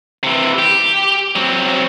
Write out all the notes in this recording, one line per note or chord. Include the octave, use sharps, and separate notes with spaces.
C3 E3
G4
F#3 C4